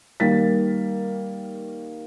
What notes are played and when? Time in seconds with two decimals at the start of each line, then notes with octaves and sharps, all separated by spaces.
0.20 D#3 G3 A#3 A#4 A6 B6